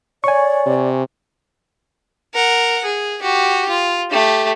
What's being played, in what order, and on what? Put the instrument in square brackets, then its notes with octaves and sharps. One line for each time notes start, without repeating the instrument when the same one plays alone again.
[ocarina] C#5 [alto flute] D5 [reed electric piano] G#5 C#6
[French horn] C3
[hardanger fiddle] A#4 F#5
G#4
F#4 G4
F4
A3 G4